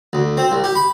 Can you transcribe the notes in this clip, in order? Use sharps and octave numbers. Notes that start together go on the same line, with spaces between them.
D2
C4
C2
G4
B5